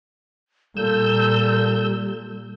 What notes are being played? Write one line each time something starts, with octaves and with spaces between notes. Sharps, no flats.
A#2 G3 A4 E6 G6